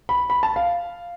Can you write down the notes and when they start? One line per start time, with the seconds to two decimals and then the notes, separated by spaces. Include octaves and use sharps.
0.09 B5
0.30 B5
0.43 A5
0.56 F5